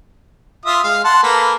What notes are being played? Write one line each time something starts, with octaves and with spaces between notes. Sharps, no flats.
F4 E5 D#6
G#3 F5
F#5 A5 C6
A#3 A4 B4